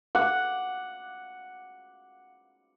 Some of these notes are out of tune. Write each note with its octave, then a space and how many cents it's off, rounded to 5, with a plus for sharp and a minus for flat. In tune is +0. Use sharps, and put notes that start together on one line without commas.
F#5 +0 D6 +0